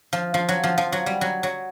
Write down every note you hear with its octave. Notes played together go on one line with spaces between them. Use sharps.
F3
F3
F#3
F3
F3
F#3
G3
F#3
F#3